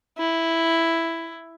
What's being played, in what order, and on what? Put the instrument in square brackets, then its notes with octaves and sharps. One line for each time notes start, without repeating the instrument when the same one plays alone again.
[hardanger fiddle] E4